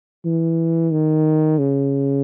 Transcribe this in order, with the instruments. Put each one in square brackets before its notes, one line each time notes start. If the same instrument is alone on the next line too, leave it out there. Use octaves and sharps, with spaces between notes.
[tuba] E3
D#3
C#3